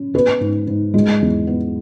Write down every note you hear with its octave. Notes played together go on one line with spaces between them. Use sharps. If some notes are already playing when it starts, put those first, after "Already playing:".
Already playing: C#4
B3 B4
G#2
G#2
G#3
E2
B3